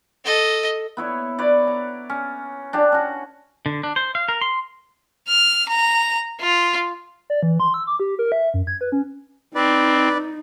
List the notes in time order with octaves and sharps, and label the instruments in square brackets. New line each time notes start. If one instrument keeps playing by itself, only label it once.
[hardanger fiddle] A4 D#5
[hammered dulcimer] B3 E4 C#5
B4 C#5 D5
A#5
C#4
D4 G4 A5
C#4 F#4
[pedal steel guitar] D3
D4
C5
F5
A#4
C6
[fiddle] F6
A#5
F4
[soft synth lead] D5
E3
C6
E6
D6
G4
A#4
E5
F#2
G#6
B4
C#4
[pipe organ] C4 [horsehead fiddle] D#4 [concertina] B4 D5